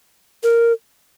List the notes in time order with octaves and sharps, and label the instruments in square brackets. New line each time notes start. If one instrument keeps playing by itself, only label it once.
[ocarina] A#4